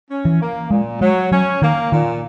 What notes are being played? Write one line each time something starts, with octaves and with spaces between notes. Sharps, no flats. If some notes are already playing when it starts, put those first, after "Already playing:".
C#4
E3
A#3
A#2 G#3
F#3 G#3
F#3 C#4
D#3 A#3
A#2 D#3